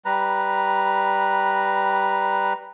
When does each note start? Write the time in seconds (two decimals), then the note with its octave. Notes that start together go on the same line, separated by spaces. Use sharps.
0.05 G3 B4 A#5